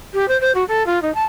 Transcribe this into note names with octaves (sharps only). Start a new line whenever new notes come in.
G4
C5
C5
F#4
A4
F4
D#4
A5